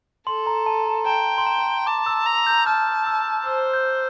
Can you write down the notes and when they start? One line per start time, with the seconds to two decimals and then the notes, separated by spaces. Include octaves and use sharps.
0.27 A4 C6
0.47 A#5
0.66 A5
0.86 A#5
1.06 G5 A#5
1.38 C6
1.46 A#5
1.87 A5 D6
2.06 E6
2.26 A#5
2.47 G6
2.66 A5 F6
3.07 E6
3.46 C5 E6
3.73 G6